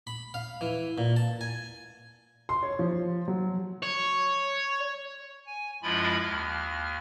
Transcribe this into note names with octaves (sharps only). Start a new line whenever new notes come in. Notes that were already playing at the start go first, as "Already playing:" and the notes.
B5
F5
E3
A#2
A5
G#5
C6
C#5
F3
F#3
C#5
G#5
F#2 F3 G#3 E4 F4 B5
D#2 F6